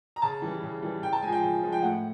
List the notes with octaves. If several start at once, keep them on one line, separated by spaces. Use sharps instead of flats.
A#5
C#3 A5
E3 G3
C#3
E3 G3
C#3 G5
A5
F3 G#3 G#5
G5
C#3
F3 G#3
G5
A2 F#5